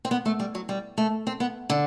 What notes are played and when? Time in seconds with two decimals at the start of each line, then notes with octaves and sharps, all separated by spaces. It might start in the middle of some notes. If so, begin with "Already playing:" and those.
0.05 C4
0.11 B3
0.25 A3
0.40 G3
0.55 F#3
0.69 G3
0.98 A3
1.27 C4
1.40 B3
1.70 D3